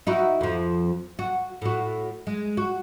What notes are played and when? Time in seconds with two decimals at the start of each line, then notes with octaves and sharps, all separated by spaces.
0.07 D#4 E4 F#4
0.41 F2 F3
1.19 F#4
1.62 A2 F#4
2.27 G#3
2.57 F#4